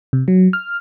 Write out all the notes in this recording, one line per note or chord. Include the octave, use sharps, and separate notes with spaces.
C3
F#3
F6